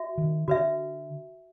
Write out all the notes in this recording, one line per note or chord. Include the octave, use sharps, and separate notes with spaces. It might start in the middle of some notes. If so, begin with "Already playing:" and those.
Already playing: F#4 E5
D#3
D3 F#4 B4 E5